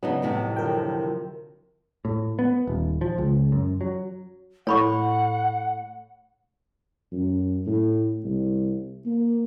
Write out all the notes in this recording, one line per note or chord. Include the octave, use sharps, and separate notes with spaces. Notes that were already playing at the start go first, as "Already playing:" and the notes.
C#3 F#3 B3 D4 D#4
F2 A2 C3
D3 F3 F#3 A#4 G5
A2
B3
D#1
F3
C#2
F#2
F#3
A2 A3 C#5 F#5 B5 C#6
F#2
A2
C2
A#3